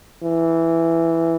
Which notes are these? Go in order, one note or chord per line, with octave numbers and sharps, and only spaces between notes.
E3